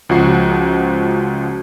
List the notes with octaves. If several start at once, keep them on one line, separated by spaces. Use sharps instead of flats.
C#2 F3 F#4 C7